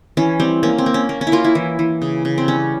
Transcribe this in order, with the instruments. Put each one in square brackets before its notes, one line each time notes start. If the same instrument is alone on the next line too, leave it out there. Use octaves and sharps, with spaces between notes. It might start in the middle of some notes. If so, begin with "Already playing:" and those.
[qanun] E3 C#4
G3 C4
A#3 C#4
C4
A#3
C#4
A#3
C#4
E4
A#3 F4
E4
E3
E3
C#3
C#3
C4
G3 C#4